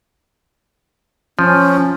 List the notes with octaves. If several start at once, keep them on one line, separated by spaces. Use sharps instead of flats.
F3 C#4